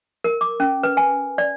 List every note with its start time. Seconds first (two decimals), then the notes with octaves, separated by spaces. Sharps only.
0.24 A#4
0.41 D6
0.60 C#4
0.83 B4
0.97 G#5
1.38 D5